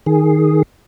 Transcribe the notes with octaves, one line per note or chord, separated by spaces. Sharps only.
D#3 G#4